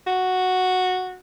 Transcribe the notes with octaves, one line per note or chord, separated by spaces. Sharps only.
F#4